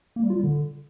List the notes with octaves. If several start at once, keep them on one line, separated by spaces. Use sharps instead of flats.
A#3
G3
F4
G3
D3